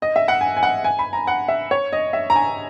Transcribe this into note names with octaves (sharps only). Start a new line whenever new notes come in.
D#5
E5
F#5
G#5
G#5
F#5
G#5
B5
A#5
F#5
E5
C#5
D#5
E5
A#5
G#5